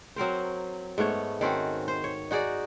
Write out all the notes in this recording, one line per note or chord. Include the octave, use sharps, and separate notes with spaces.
F#3 C4 A#4 C5
G#2 A3 B3 C#5
D#3 C4 C#4 F#4
C5
C#5
D#4 F#4 G#4 D5